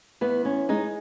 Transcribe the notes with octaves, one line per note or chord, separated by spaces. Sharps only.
E2 B3
C#4
G#3 D#4